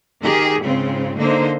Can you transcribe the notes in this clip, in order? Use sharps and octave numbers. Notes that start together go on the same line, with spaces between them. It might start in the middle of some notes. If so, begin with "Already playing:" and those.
D#3 G4 G#4 A#4
G#2 C#3 C4 F4
D3 A#3 D#4 C5